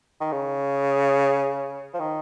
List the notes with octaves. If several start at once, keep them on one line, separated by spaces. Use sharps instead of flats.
D#3
C#3
F3
D#3